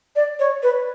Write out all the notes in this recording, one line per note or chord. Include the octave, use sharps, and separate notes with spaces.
D5
C#5
B4